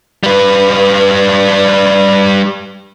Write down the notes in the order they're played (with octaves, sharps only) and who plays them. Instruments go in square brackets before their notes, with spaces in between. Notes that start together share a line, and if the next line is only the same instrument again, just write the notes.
[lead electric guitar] G3 B4